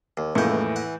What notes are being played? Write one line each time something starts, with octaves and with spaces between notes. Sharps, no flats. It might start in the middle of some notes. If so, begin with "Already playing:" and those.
D#2
F1 C#2 A2 E3 A#3 F#5 G6
F#5